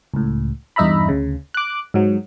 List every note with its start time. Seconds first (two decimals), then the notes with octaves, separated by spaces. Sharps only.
0.14 C#2 A2
0.76 E2 G2 D#4 E5 A#5 B5
1.09 D2 C#3
1.54 D6 F#6
1.94 G#2 F#3